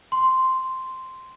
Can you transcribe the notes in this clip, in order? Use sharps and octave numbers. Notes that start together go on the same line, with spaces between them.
C6